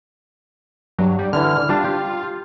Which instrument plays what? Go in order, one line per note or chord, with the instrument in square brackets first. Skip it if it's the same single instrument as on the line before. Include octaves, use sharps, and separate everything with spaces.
[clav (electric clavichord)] G2 [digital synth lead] F#3
[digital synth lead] G3
[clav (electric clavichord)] D3 E3 [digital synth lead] F6
[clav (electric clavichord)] G3 D4 A5 [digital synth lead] F4
[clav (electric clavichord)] G4